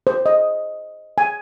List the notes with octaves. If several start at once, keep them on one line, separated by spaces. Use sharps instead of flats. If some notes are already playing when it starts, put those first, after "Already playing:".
C5
D#5
G#5